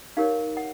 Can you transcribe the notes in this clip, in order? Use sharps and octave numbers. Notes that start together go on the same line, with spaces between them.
D#4 G4 A#4 C#5 F5
F#5